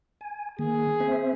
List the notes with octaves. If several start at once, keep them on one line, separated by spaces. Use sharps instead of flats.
G#5
D#3 A#3 G#4
C4 C5 E5